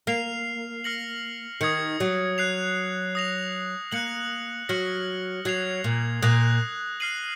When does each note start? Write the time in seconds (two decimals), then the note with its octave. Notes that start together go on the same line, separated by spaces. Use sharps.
0.07 A#3 F6 C7 F7
0.84 F6 A#6 C#7 F#7
1.61 D#3 D#6 G#6 C#7
2.00 F#3
2.38 F#6 C7 F7
3.15 D#6 A#6 F7
3.92 A#3 F#6 C#7 F#7
4.69 F#3 F6 A#6 C#7 F#7
5.45 F#3 G#6 C7 F7
5.84 A#2
6.22 A#2 D#6 F#6 A#6 F7
7.00 F6 C7 D#7 F#7